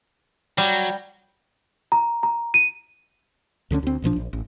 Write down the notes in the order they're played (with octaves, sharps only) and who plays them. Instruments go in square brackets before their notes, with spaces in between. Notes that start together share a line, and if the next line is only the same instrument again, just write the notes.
[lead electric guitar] F#3 [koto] G3
[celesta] A#5
A#5
D#7
[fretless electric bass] D2 D3 F3 C#4
D2 C4
A1 A#2 F3 D4
A#1
A1